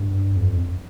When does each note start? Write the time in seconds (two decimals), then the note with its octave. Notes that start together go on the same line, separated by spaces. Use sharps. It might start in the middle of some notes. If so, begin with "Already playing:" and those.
Already playing: G2
0.36 F2